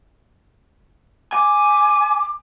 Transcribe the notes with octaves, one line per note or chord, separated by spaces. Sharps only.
G#5 D6